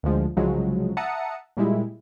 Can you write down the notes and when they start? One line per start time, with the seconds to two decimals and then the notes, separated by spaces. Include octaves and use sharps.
0.03 D2 D3 F3 G#3
0.37 C2 C#3 F3 F#3 G#3
0.97 E5 F#5 A5 A#5 D#6 C#7
1.57 A#2 G3 G#3 E4